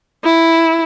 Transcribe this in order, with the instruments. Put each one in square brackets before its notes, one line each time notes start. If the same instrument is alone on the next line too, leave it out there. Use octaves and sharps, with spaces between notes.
[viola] E4